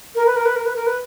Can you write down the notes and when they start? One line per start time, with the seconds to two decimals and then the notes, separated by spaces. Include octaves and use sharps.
0.15 A#4
0.26 B4
0.36 A#4
0.45 B4
0.55 A#4
0.65 B4
0.76 A#4
0.86 B4